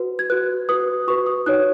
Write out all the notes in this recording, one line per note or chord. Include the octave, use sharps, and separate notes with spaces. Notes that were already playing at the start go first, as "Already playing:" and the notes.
Already playing: F#4 B4
G#6
F#4 B4 F#6
F#4 B4 D#6
F#4 B4 C#6
D#6
D#4 F#4 C#5 F#6